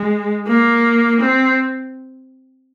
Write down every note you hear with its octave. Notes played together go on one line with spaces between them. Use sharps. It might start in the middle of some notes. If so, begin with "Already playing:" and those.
Already playing: G#3
A#3
C4